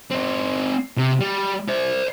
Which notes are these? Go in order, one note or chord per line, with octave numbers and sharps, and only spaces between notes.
C4 D#4
C3
G3
C5 D5